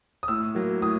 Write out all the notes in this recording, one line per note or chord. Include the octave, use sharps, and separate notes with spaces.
D#6
A2 E6
F#3 A#3
A2 D#6